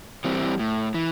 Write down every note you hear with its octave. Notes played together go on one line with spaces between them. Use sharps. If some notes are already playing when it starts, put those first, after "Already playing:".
E3 G3 C4
A2
E3